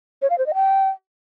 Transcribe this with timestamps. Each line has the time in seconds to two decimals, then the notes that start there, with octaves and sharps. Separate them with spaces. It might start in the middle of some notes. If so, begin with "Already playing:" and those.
0.22 C#5
0.30 F5
0.38 C5
0.46 D#5
0.54 G5